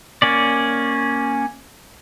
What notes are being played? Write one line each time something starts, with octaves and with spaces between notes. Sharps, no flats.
A#3 C#4 D5